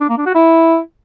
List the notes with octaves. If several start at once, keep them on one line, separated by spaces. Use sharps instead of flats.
D4
A#3
D4
F#4
E4